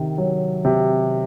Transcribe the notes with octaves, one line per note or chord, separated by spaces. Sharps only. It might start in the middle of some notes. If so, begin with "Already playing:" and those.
Already playing: C3 D#3
F#3
C3